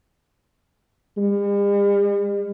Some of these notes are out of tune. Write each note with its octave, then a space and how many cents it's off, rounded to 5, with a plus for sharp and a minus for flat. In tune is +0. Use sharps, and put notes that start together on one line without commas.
G3 +45